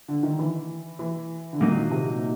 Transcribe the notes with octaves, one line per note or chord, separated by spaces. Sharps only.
D3
D#3
E3
E3
D3
A#2 D#3 F#3 A#3 D#4
C3